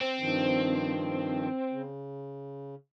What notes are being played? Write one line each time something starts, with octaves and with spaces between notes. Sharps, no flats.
C4
G2 D#3 F3
C#3